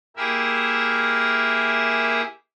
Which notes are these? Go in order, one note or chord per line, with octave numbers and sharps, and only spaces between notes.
A#3 E4 G4 G#4 A#4 E5